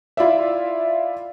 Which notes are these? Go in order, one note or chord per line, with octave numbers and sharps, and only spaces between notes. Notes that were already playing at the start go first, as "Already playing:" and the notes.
E4 F4 D5 E5